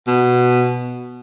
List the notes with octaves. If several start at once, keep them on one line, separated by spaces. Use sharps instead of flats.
B2